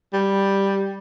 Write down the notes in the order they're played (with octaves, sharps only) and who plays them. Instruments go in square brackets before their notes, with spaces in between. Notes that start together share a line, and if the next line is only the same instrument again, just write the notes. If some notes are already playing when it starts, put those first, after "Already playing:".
[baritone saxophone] G3